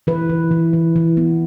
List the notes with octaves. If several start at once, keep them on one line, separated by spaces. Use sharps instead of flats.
E3 B4
E3
E3
E3
E3
B3